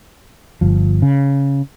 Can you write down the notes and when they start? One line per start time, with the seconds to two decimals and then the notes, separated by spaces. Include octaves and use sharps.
0.61 G1 F3
1.02 C#3